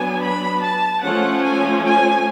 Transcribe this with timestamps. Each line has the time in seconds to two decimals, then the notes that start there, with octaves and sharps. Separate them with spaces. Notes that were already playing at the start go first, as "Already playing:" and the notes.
Already playing: F#3 B3 D4 G#5
0.21 B5
0.62 A5
1.02 F3 A3 C#4 F#5
1.43 G#5
1.84 G#5